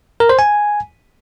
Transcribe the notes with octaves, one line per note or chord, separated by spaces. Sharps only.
A#4
C5
G#5